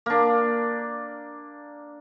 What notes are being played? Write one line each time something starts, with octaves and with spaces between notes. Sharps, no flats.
A#3 D4